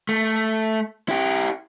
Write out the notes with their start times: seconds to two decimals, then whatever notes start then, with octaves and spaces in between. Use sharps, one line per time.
0.09 A3
1.09 E4 G4